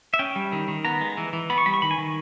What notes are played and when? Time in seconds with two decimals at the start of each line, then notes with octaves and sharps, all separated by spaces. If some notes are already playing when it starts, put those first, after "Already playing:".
0.14 E5
0.19 C#4 G5
0.36 G3
0.52 D#3
0.68 D#3
0.85 B3 A#5
1.01 G#3
1.17 E3
1.33 E3
1.50 B3 B5
1.58 C#6
1.66 G3 B5
1.74 C#6
1.82 D#3 B5
1.91 G#5
1.98 D#3